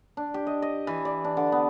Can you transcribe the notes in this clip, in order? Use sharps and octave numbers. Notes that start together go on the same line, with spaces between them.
D4
G4
D#5
D#5
E3
D5
D4
D3
B3